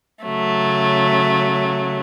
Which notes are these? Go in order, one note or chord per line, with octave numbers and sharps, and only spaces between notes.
C#3 F#3 A3